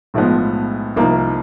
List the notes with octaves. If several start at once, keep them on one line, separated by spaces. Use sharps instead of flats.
B1 A2 F3 G#3 B3
C2 C3 F3 A#3 D#4